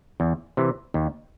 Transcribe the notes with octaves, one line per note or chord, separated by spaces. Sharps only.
E2
C3 E3
D#2